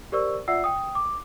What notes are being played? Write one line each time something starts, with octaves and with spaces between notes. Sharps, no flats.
G4 A#4 C5 D5 C#6 E6
F4 D5 E5 F#5 E6 C7
G5 D#6
D6